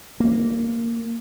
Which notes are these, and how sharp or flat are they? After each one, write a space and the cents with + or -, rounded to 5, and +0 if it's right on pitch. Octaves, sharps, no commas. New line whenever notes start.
A#3 -10